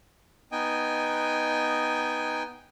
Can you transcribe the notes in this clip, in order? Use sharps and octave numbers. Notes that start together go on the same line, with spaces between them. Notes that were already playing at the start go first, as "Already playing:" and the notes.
B3 D#4 D#5 G5 G#5